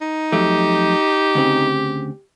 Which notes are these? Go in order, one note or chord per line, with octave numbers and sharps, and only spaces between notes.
D#4
F2 F#3 A3 G4
D2 C#3 C4